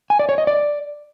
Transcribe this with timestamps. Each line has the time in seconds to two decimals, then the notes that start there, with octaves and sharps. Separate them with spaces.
0.10 G#5
0.19 D5
0.29 C#5
0.38 D#5
0.47 D5